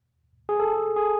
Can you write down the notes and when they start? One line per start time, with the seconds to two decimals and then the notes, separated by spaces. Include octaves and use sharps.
0.49 G#4
0.60 A4
0.96 G#4